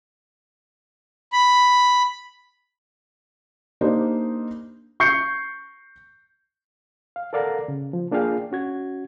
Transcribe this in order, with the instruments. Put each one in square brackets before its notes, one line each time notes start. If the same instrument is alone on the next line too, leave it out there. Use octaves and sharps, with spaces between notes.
[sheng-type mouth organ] B5
[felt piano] A#3 D4 D#4 G4 C5
[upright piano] C#6 G6 C7 C#7
[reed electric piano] F5
A4 A#4 D5 F5 F#5 A#5
C#3
F3
A#3 D4 F4 G#4 F5 G5
C#4 F#4 G#6